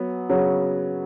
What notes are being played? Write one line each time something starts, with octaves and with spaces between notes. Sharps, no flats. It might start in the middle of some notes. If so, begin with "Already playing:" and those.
Already playing: F#3 B3
C#3 F#3